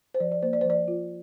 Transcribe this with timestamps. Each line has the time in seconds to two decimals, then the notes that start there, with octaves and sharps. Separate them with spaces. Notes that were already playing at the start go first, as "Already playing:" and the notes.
0.14 C5
0.20 F3 D5
0.32 D5
0.42 A#3 C5
0.53 D5
0.61 C5
0.65 F3 D5
0.88 F4